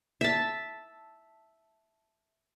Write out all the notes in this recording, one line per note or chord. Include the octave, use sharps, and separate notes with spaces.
E5 A5